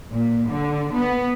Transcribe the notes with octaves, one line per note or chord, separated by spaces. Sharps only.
A#2
D3
B3